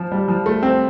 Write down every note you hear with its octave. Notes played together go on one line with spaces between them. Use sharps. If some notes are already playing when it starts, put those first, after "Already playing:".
Already playing: F3
G3
F3
A3
C4